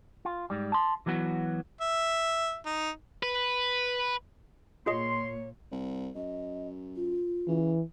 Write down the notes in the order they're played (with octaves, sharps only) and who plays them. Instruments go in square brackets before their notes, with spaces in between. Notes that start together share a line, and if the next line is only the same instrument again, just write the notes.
[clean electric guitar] F4
G#2 G3
A5 C6
E3 F#3 B3 F#4
[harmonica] E5
D#4
[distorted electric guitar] B4
[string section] A#2 [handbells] F4 G#4 D#5 [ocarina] C#5 [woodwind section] C6
[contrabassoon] C2
[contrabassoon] F#2 [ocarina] D#5
[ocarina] F4
[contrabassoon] C#3 [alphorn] E3